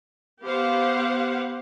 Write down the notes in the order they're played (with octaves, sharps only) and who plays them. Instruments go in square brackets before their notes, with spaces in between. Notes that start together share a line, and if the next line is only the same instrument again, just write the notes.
[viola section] B3 G4 C5 F5 F#5